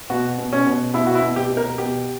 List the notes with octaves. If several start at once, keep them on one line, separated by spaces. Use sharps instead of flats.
B2 F#4
B2
C#4
B2
B2 E4
F#4
E4
B2
G4
B2
A#4
B2 G4